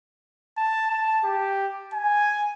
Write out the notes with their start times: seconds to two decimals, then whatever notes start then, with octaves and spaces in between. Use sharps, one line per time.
0.57 A5
0.90 A5
1.24 G4
1.93 G#5